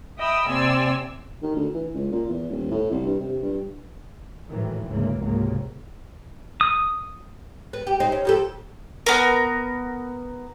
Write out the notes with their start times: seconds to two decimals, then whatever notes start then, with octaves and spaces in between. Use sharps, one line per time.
0.18 D#5 E5 G5 B5 D#6 E6
0.49 C3 A#3 C4 D5 G#5 E6
1.42 D#3
1.56 D2
1.74 E3
1.94 C#2
2.12 A#2
2.28 E2
2.50 D#1
2.71 A2
2.91 C2
3.06 G2
3.20 C3
3.42 G2
4.49 G#1 A2 D#3 E3 F#3
4.86 D2 G#2 C#3 E3 G#3 A#3
5.20 C#2 G#2 C3 F#3 A#3
6.61 D#6
7.73 B3
7.87 G4
8.00 C4 D#4
8.12 C#4
8.25 F2 G4 A4
9.06 B3 A#4